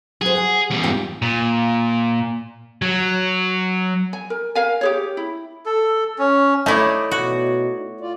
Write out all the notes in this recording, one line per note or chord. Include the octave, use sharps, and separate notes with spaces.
F#3 G#4 C5
F#5 G#5
E2 G3
G#2 F4 G5
A#2
F#3
G#5
A#4
A#4 F5 G#5
G4 G#4 C#5
E4
A4
C#4
A3 D#4 E4 C#5 D5
B2 F#4
F4 D5